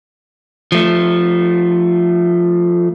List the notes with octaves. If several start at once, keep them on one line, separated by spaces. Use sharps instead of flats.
F3 A3